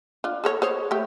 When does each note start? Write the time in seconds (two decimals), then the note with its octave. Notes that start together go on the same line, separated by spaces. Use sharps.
0.24 D4 F4
0.44 G#4 A4 C#5
0.62 G#4 C5 C#5
0.91 A3 G4